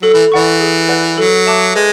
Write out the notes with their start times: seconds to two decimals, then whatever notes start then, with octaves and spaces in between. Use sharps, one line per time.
0.02 F#3 A4
0.14 E3
0.32 E3 D5 F#5 C#6
0.60 G#4
0.88 B4 D5 F#5
1.17 F#3 A4
1.46 E5 A5 D6 F#6
1.75 G#3 B4